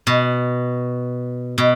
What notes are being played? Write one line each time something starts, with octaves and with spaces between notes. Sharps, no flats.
B2
B2